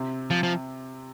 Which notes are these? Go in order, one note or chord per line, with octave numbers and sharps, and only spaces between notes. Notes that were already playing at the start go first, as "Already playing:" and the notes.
Already playing: C3 C4
F3
F3